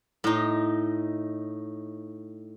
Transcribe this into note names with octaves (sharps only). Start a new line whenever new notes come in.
A2 D#4